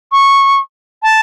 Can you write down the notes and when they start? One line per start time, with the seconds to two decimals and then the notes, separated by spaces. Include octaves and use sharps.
0.12 C#6
1.03 A5